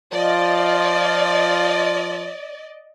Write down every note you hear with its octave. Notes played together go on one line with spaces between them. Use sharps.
F3 F4 D5 D#5